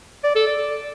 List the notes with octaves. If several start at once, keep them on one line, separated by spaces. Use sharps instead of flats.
D5
A4
D5